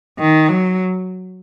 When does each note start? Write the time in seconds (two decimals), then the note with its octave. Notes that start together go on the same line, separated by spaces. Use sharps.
0.19 D#3
0.49 F#3